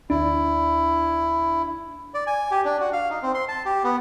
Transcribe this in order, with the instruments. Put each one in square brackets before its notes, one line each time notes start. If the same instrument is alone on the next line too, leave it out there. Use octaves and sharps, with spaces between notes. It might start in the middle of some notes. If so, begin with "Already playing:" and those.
[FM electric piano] D2 D4 [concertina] E4
[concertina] D5
G#5
G4
D4
F#4
F5
D#4
C4
C6
A5
G4
B3